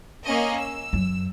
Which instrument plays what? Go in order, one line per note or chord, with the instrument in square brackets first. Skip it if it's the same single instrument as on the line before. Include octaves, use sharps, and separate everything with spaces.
[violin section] A#3 C#4 D#5
E6
[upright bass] F#2